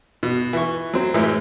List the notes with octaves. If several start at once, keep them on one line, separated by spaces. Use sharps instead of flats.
B2
E3 C#6
F#3 C4
F#2 A2 E3 G#3